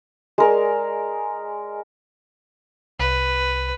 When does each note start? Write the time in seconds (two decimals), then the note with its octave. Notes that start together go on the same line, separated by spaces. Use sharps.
0.38 G#3 A#4 D5
2.99 C2 B4